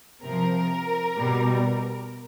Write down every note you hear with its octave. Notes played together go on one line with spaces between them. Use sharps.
C3 F3 A#4
B2 G3